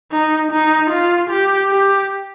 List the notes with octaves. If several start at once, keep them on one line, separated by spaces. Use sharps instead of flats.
D#4
D#4
F4
G4
G4